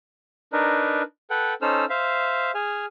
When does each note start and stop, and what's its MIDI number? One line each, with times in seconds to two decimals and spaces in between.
0.53 1.02 62
0.53 1.02 63
0.53 1.02 70
0.53 1.02 71
1.30 1.54 69
1.30 1.54 71
1.30 1.54 78
1.30 1.54 79
1.62 1.85 61
1.62 1.85 63
1.62 1.85 69
1.62 1.85 72
1.62 1.85 88
1.62 1.85 89
1.90 2.51 72
1.90 2.51 76
1.90 2.51 77
2.54 2.86 68
2.54 2.86 80
2.54 2.86 89